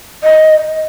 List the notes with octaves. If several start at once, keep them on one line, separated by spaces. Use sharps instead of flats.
D#5